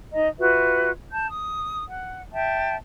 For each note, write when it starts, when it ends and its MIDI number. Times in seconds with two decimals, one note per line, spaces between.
0.13 0.29 63
0.13 0.29 75
0.13 0.29 82
0.39 0.90 65
0.39 0.90 66
0.39 0.90 71
0.39 0.90 76
1.12 1.28 81
1.12 1.28 91
1.29 1.83 87
1.89 2.21 78
2.32 2.76 76
2.32 2.76 79
2.32 2.76 81